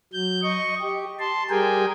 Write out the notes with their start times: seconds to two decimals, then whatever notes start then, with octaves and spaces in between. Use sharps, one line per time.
0.13 F#3 G6
0.43 D#5 C#6
0.81 G4
1.20 A5 C6
1.50 G3 G4 G#4 A#4 G5 G#5